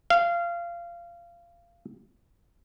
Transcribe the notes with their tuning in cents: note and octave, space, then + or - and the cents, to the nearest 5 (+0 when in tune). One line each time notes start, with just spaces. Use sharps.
F5 -20